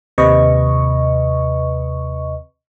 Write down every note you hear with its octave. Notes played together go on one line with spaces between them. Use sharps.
D#2 C3 B4 D#5 C#6